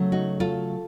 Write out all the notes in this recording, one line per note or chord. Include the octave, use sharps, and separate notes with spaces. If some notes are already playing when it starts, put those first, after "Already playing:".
Already playing: C#3 F#3 A3
D#4 F#4
F4 A4